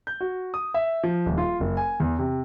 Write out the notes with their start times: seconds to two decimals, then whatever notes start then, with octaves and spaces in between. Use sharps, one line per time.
0.07 G6
0.21 F#4
0.54 D#6
0.74 E5
1.03 F3
1.26 D#1
1.38 F4
1.60 F#1
1.77 G#5
2.00 E2
2.19 C3